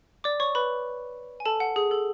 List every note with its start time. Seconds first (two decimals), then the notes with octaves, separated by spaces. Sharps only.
0.24 D5 D6
0.40 C#5 C#6
0.55 B4 B5
1.40 G#5
1.45 A4 A5
1.60 F#5
1.76 G#4
1.91 A4